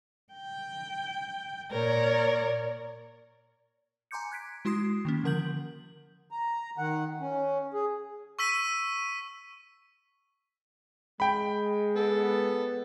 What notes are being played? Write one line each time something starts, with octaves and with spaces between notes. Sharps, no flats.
G5
A#2 A#4 C#5 D5
G#5 A#5 C6 D6 G6 C#7
F#6 G#6 B6 D7
G#3 E4 F#4 C6 D#6 C7
D#3 A#3 C#4
D3 F3 A#4 F#5 G6 F#7
A#5
D#3 F#5
C#4
G#4
C#6 E6 B6 D#7
G#3 G5 B5
B3 A4